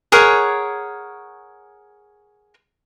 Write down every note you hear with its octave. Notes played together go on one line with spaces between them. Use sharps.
G#4 A#4 C#5 F#5